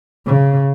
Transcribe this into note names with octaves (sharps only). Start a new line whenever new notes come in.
C#3